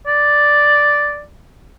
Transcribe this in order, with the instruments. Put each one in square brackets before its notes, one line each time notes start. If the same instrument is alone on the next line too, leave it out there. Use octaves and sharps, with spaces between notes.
[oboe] D5